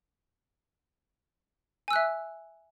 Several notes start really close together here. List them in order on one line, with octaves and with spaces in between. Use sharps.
G#5 E6 F#6 E5